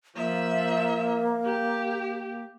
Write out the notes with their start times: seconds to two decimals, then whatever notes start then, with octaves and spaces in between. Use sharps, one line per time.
0.16 F3 A#3 E5
1.46 G4